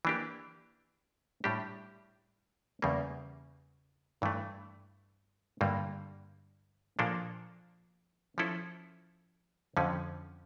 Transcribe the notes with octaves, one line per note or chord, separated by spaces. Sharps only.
E3 A#3 D4 G4
A2 G3 D4 G4
E2 C#3 G3 A#3
G2 E3 A3
G2 D3 G3 A#3
A#2 F3 A#3 D4 A4
F3 C#4 E4 A4
F2 D3 F3 C#4